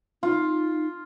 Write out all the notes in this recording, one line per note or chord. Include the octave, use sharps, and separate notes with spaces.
D#4 F4